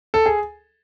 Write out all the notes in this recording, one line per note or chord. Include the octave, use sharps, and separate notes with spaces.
A4
G#4